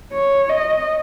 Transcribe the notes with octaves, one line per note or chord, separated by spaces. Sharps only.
C#5
D#5